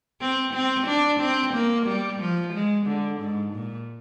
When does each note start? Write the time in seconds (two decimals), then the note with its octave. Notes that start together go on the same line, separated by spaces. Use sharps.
0.21 C4
0.54 C4
0.87 D4
1.20 C4
1.54 A#3
1.87 G3
2.20 F3
2.53 G#3
2.87 D3
3.20 G#2
3.54 A#2